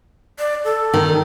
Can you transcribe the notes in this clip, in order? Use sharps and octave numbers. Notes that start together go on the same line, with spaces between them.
D5
A4
D#3